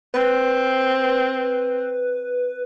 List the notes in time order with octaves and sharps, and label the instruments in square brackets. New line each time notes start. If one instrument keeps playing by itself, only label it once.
[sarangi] C4 [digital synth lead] B4